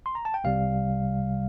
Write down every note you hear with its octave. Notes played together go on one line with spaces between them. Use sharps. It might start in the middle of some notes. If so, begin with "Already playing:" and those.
C6
A#5
A5
G5
C2 C3 G3 F5